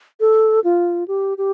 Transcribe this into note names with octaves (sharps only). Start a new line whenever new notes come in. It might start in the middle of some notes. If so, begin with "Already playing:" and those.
A4
F4
G4
G4